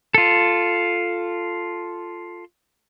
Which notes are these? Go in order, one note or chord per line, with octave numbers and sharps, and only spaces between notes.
F4 A4